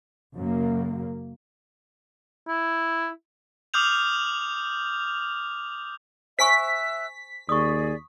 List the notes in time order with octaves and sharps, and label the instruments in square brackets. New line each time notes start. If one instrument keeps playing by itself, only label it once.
[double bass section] F#2 C#3 A#3
[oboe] E4
[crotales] D6 D#6 F6 G6 F7
[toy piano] C5 G#5 C#6 [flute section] E5 E6 F#6 [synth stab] B6
[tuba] D#2 [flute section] G#4 D5 [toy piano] C#6 D#6